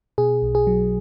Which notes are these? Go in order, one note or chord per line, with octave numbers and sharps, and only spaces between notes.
B2 G#4
B1
G#4
F#3